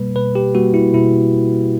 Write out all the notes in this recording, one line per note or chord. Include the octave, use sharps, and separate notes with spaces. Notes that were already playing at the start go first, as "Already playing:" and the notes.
Already playing: B2 G3 A#3 B4
B2 B4
G4
G3 A#3 F#4
E4
B2 E4